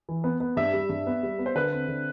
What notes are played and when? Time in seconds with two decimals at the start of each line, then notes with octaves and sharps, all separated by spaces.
0.09 E3
0.24 B3
0.40 B3
0.57 G2 E5
0.73 G3
0.89 G2
1.07 B3
1.23 G3
1.39 B3
1.46 C5
1.55 D3 B4
1.73 C4
1.88 D3